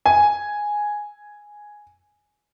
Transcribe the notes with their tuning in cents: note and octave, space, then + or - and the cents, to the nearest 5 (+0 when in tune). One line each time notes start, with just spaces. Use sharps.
G#5 +0